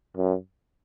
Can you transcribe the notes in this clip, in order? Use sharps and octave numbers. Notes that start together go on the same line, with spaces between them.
F#2